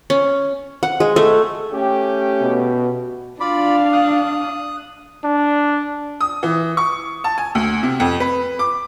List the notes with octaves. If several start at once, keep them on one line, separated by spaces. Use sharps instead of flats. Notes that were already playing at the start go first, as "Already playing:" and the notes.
C#4
F#5
G#3
A3
A3 C#4 G4
B2
D4 F4 D5 F5 B5
D#6 F#6
D4
D#6
E3
C#6
A5
G#5
D2
C3
F2
B4
D6